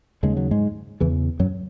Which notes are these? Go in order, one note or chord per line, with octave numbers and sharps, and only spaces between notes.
D#2 C#3 G#3
F#3
G#2 G#3
E2 C#3 E3
F#2 F#3